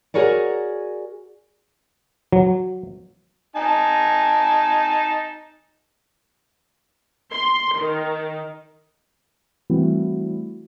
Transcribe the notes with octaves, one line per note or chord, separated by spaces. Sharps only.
F#4 G#4 A#4 C#5 D5
F#3
D#4 G#5 A5
C6
D#3
E3 G3 A3 C4 E4 F#4